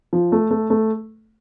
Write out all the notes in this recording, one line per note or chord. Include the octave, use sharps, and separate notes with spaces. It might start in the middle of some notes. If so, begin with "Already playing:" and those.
F3
A3
A3
A3